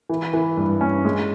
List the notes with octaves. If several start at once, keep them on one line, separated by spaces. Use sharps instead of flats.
E3
E3
G2
C#4
G#3